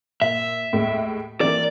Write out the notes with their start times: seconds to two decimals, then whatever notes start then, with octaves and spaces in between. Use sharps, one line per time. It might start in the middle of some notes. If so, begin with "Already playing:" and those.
0.22 A#2 E5
0.72 D#2 A2 G#3
1.41 D#3 E3 A#3 D5